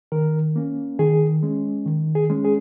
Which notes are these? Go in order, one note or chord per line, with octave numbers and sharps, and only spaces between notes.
D#3 A#4
A#3 C#4
D#3 G#4
G#3 C#4
D#3
G#4
G#3 C#4
G#4